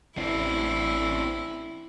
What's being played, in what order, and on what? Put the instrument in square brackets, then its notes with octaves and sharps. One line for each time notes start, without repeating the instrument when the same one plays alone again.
[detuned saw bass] A1 [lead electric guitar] C4 D4 [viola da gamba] E4